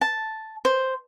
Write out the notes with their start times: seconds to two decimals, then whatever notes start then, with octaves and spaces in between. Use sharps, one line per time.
0.01 A5
0.65 C5